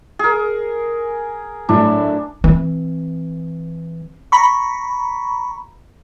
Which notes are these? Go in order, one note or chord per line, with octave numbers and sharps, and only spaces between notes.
G#4 A#4
A2 F#3 D4 E4
E3 C4
A#5 B5 C#6